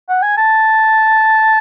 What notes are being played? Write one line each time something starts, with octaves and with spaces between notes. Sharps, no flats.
F#5
G#5
A5